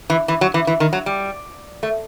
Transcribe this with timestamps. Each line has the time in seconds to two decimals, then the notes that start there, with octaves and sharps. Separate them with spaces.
0.10 E3
0.28 E3
0.41 F#3
0.54 E3
0.67 E3
0.80 D#3
0.93 F#3
1.06 G3
1.83 A3